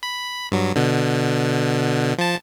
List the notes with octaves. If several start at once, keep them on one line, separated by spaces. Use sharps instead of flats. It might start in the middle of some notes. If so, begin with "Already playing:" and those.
B5
G2 F#3
B2 D3
F3 A5